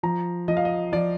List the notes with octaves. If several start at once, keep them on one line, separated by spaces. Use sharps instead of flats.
F3 A#5
F3 D#5
F5
D#5
F3 D5